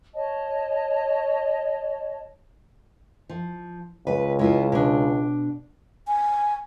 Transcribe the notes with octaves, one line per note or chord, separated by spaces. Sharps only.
C#5 D#5 A5
F3
C#2 B4
G#3 E4 F4
B2 D4
G#5